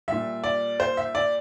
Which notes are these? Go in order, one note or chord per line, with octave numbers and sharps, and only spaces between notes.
A#2 G3 E5
D5
C5
E5
D5